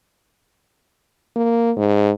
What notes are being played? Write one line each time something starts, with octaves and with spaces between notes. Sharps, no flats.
A#3
G#2